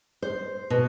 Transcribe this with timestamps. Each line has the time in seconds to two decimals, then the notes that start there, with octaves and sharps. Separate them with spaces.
0.22 C5
0.70 B2